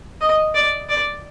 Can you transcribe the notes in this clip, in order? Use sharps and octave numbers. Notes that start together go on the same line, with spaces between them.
D#5
D5
D5